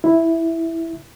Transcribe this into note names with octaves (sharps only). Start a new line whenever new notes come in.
E4